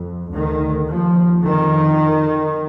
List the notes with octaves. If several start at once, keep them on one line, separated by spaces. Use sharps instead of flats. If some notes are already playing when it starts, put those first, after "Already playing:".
Already playing: F2
D2 D#3
D#2 F3
F2 D#3